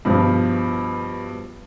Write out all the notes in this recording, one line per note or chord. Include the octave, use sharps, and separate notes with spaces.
G2 B2 F3